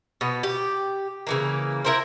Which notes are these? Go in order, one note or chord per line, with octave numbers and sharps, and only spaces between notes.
B2 B3
G4
C#3 E3 A#3
E4 A#4 C5